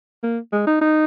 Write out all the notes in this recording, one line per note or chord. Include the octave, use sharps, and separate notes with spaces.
A#3
G#3
D#4
D#4